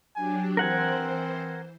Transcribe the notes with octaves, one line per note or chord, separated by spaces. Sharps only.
F#3 D4 G4 G#5
E3 C4 A#4 C5 F#5 G#5